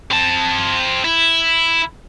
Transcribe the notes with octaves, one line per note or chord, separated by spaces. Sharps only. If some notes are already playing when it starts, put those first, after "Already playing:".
C4 A5
E4